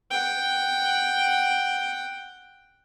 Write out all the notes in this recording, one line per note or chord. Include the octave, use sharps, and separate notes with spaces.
F#5 G5